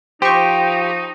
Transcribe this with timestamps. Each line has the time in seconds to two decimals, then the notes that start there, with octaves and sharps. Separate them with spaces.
0.22 F3 D#4 G4 C5 C#6